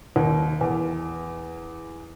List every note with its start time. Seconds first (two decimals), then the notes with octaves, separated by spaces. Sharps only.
0.16 D#2
0.61 E2